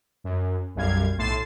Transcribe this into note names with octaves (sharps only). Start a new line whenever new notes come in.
F#2
B1 F#2 G3 F5 G#6
B1 A2 C6 A6 C7 E7